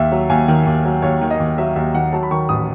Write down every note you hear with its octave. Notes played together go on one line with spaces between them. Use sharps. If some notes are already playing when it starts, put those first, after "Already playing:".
Already playing: D#2 E5
F#3
D#2 G#5
D#3
D#2
F#3
D#2 C#5
D#3
D#5
D#2
F#3 E5
D#2 E5
D#3 F#5
F#3 A5
B5
D#3 C#6
A1 D#6